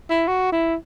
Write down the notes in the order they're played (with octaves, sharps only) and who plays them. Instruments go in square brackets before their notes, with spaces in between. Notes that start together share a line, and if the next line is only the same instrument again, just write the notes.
[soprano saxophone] E4
F#4
E4